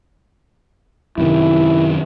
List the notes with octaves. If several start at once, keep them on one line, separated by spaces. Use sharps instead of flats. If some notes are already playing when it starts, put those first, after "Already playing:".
F#2 C3 D#3 E4